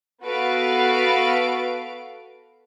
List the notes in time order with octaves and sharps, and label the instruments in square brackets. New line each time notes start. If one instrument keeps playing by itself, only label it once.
[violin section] B3 F#4 A4 B4 F5 D7